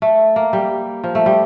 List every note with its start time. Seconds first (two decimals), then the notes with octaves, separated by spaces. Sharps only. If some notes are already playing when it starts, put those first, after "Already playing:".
0.02 A3
0.36 A#3
0.53 G3
1.04 F3
1.15 A3
1.26 G3